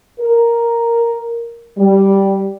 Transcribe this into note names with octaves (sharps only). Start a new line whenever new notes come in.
A#4
G3